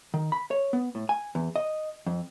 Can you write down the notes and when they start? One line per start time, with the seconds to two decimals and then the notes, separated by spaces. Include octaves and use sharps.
0.14 D#3
0.32 B5
0.51 C#5
0.73 B3
0.95 A2
1.09 G#5
1.35 E2
1.56 D#5
2.07 F2